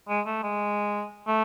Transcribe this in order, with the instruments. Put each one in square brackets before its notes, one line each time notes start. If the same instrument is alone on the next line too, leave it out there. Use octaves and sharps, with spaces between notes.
[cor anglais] G#3
A3
G#3
A3